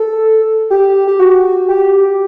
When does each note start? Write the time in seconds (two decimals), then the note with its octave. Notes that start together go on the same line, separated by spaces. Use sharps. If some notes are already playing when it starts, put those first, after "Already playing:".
Already playing: A4
0.70 G4
1.07 G4
1.20 F#4
1.68 G4